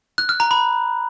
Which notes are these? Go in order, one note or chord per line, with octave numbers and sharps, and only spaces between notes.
F#6
F6
A#5
B5